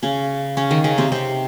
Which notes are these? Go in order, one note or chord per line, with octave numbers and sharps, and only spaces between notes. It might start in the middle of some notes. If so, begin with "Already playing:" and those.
C#3 C#4
C#3 C#4
D#3 D#4
C#3 C#4
C3 C4
C3 C4